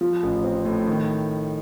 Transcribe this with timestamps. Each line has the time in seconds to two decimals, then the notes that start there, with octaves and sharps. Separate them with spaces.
0.01 F3
0.23 A1
0.44 C4
0.65 A2
0.87 D#3